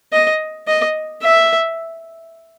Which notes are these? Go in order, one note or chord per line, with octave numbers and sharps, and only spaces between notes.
D#5
D#5
E5